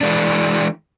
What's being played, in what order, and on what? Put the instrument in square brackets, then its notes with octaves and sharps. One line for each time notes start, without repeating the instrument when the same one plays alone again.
[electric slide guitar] E3 G#3 D4